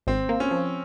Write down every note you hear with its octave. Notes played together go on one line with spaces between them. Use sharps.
G#1 C4
A#3
C#4
F3